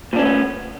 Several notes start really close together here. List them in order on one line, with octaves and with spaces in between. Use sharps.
A#2 D4 C#4 A3 B3